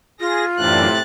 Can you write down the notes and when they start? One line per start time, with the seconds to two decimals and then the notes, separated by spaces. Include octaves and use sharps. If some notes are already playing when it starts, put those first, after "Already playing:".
0.20 F4 G#4 A#6
0.59 F#2 A2 C3 E3 D4 F#6 A6